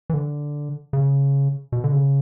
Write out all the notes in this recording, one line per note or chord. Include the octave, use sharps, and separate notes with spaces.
E3
D3
C#3
B2
D3
C#3